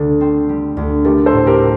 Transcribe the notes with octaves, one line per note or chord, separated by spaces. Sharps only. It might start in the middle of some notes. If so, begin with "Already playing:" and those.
Already playing: D2 D3
C4
G3
D2
A3 G4 A#4
A4 C5
A2
G4 A#4
F#3